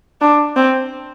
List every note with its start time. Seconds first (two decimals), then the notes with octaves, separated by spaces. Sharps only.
0.21 D4
0.56 C4